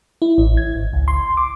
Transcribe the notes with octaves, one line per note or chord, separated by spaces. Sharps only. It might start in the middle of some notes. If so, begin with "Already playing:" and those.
E4
A1
G#6
G#1
C#2
C6
D6